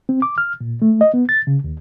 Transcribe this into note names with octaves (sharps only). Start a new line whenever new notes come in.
C4
D6
F6
A#2
A3
D#5
B3
A6
C#3
D#2